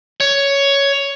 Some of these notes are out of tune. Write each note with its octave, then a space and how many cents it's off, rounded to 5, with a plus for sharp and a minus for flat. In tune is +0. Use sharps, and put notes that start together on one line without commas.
C#5 +10